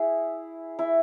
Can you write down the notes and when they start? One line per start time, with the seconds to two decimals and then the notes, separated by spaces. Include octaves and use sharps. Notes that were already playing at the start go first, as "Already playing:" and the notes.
Already playing: E4 G#4
0.79 E4